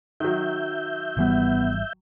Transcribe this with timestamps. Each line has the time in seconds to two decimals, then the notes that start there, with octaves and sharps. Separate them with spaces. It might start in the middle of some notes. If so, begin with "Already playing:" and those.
0.20 D#3 F#3 E5 G6
1.17 G#1 E3 G3 B3